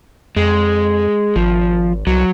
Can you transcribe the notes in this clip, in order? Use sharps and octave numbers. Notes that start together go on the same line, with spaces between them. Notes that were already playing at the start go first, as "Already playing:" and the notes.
F2 G#3
G#1 F3
C2 F#3